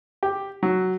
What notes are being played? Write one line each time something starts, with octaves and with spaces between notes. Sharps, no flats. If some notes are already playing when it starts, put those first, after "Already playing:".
G4
F#3